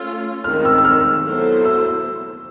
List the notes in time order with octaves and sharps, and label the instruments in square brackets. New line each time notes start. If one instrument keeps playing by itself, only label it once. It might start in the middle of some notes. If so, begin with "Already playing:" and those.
Already playing: [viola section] A3 C#4 F4 [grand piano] E6
[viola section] D#3 G#3 C4 [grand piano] F6
[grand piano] E6
E6
F6
[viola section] F#3 B3 E4 A4 C5
[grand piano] E6